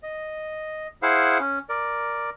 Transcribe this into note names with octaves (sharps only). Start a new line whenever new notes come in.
D#5
E4 G#4 C5 F5 F#5
C#4
A#4 D5